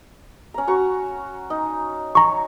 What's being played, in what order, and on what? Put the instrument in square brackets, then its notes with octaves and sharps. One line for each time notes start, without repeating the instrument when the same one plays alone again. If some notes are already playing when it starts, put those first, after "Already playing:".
[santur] C#4 A#5
F#4 A#5 C#6
D#4
[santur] C#5 [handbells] A#5 C#6